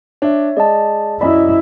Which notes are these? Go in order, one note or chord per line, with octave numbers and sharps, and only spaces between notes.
D4 C#5 E5
G#3 D5 D#5 A5
F#2 E4 D5 D#5 B5